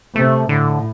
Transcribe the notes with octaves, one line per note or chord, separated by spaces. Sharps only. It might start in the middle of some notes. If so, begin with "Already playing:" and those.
C3 A3
A2 D3